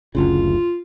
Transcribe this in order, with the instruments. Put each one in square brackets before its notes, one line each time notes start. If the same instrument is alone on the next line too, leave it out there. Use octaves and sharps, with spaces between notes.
[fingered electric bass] F#1 D2 C#3 [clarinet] F4